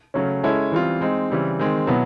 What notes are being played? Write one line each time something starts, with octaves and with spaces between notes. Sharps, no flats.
C#3 F#3 A3 C#4
G#3 C#4 E4 A4
E3 G3 C4 F4
G#3 C4 D#4
C#3 E3 G3 C4
D#3 G#3 C4
B2 F#3 B3 E4